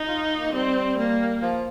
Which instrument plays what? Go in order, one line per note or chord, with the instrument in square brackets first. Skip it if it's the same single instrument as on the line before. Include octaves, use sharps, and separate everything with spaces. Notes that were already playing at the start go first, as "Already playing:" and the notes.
Already playing: [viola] D#4
[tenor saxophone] F4
A#3
[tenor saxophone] G3 [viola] C4
[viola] A#3
[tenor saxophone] F3